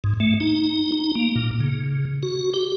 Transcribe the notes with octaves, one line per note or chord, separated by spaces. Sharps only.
G#2
A3
D#4
D#4
A#3
A#2
C#3
F#4
G4